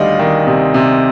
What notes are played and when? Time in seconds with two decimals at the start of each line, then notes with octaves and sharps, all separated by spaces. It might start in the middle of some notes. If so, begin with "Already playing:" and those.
Already playing: D2 D#3 G3 D5 D#5 F5
0.19 D#3
0.47 C3
0.74 C3